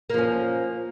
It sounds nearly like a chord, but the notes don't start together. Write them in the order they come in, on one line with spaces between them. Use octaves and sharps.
A#3 F3 C#4